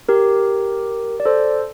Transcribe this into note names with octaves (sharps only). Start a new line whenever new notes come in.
G4 A#4
D5
A4 C5